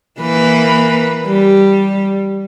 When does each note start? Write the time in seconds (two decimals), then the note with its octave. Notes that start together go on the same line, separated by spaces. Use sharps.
0.19 E3 A#3 B4
1.26 G3